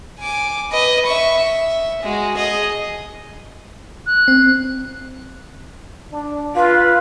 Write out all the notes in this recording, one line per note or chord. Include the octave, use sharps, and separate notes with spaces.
G#5 D6
B4 D#5
E5 C#6
E5
G#3 F#4
G#4 D#5
F#6
C4
D4
F4 B4